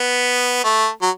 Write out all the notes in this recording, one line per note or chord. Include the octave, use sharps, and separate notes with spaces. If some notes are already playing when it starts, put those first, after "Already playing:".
Already playing: B3
A3
F#3